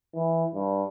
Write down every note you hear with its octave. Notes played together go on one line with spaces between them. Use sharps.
E3
G2